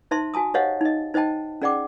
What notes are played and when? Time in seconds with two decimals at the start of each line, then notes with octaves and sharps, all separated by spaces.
0.11 D#4 C5 E5 A5 C6
0.34 F#4 G#5 A5 D#6
0.54 G4 C5 C#5 D#5 F5 F#5
0.81 D#4 D#5
1.14 D#4 C5 D#5 G5 A5
1.62 C#4 G#4 D5 F#5 G5 D6